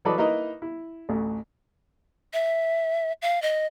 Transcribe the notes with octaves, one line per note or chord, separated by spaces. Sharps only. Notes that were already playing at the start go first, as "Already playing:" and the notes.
E3 F#3 A4 B4 D5 D#5
A#3 D#4 E4 B4 D#5 A#5
E4
A1 D2
E5
F5
D#5